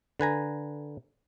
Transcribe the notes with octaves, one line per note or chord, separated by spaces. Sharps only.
D3 B4 G#5 A#5